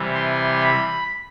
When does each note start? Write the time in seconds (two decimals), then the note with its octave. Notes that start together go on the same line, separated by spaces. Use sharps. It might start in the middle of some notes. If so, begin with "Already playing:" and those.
Already playing: C3 E3 G3
0.14 C6
0.61 B5